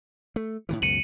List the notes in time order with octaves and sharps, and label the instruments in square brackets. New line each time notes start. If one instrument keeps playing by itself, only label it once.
[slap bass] A3
A2 D#3 E3
[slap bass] C#2 F#2 B2 [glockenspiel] C#7 D#7 F#7